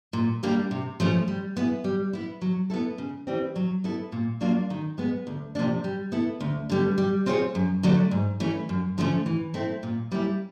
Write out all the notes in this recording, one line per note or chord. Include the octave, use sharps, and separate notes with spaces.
A#2
G3 A#3 D4 G4
C3
F3 A3 C#4
G3
B3 E4 G#4
G3
B3 E4
F#3
B3 E4 A4
C#3
E3 G3 C4
F#3
B3 E4 A4
A#2
F#3 A#3 D4 F4
D#3
G#3 B3
D2
C3 F3 A#3 D4
G3
B3 E4 A4
D2
D3 G3 B3
G3
C4 F4 G#4 C#5
F#2
D3 F#3 A3 D4
G#2
E3 A3 C#4
F#2
D3 F3 A3 C#4
E3
A3 C4 E4
A#2
G3 A#3 C#4 E4